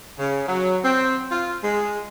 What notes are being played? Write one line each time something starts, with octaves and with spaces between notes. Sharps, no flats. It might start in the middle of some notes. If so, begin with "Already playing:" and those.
C#3
F#3
C4
F4
G#3